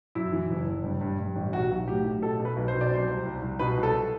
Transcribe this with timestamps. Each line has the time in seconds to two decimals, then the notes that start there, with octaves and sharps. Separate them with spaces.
0.15 F#2 E4
0.32 E3
0.50 F#1
0.67 F#1
0.84 G2
1.01 G2
1.19 G2
1.36 A1
1.53 B1 F#4
1.71 B1
1.87 A2 G4
2.04 A2
2.22 B2 A4
2.39 B2
2.45 B4
2.56 B1
2.68 C5
2.74 B2
2.81 D5
2.91 C3 C5
3.08 C2
3.25 C2
3.42 C2
3.59 B2 B4
3.77 C2
3.83 A4